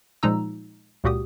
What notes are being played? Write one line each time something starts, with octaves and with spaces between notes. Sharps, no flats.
A#2 F3 G#3 D#4 A#5 E6
C#2 A#2 F#4 G4 D#6